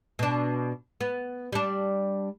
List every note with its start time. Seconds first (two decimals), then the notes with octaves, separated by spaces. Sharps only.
0.19 B2 D4
1.01 B3
1.53 G3 D4